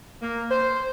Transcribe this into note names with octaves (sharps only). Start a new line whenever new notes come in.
A#3
C5